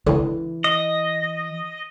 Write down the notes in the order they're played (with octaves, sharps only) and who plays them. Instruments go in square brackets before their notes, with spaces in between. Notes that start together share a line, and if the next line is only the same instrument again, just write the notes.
[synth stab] C#2 D3 [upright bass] E3
[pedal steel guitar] D#5